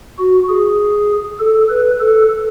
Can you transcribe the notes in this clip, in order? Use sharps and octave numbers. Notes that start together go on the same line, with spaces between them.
F#4
G#4
A4
B4
A4